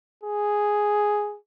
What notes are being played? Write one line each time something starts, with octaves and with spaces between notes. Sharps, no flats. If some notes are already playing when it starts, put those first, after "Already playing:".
G#4